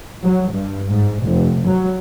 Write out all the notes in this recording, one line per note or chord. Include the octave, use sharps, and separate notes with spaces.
F#3
G2
G#2
F1
F#3